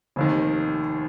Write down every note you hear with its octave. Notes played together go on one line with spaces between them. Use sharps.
F1 D#2 D#3